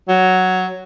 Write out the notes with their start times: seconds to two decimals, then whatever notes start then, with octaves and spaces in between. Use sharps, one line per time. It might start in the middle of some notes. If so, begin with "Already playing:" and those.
0.08 F#3